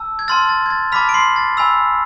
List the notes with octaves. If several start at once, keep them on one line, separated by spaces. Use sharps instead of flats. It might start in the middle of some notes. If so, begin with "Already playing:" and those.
Already playing: A5 E6
G#6
A5 C6 F6 A6
A6
G#6
A6
A5 B5 D6 F6 B6
D7
C6 C7
A6
G#5 B5 E6